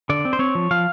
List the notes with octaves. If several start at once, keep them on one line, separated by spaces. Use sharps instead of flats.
D3 D5
C4
C5
C4 C#5
F3
F3 F5